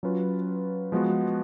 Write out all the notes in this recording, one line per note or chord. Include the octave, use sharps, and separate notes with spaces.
F#3 C#4 F4 B4
F3 G#3 B3 F#4